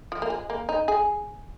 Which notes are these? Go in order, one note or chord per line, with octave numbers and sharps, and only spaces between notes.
F3
A#3
G#3
A#3
D#4
G#4